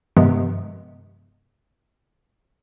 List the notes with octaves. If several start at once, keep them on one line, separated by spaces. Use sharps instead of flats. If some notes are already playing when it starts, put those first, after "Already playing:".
G2 C3 D#3 F3 G#3 B3